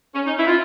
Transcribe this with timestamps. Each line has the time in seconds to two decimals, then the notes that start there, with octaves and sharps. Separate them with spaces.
0.14 C#4
0.26 D#4
0.38 E4
0.47 F4